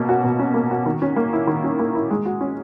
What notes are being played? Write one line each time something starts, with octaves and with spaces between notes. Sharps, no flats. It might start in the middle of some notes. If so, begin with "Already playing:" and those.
Already playing: B2 A#3 C#4
F#4
B2
C#4
A#3
F#4
D#3
C#4
A#3
E4
D#3
C#4
A#3
E4
G#3
F#4
C#4